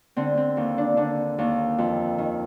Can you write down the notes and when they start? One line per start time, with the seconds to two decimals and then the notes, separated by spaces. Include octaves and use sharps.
0.17 D3 C4
0.37 C4
0.57 D#2
0.78 D4
0.97 D3 D4
1.38 D#2
1.78 F2
2.18 D#3